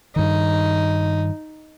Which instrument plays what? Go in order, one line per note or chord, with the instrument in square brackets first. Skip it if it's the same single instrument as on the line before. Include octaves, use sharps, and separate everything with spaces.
[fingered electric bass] G2 D#3 [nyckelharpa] D#4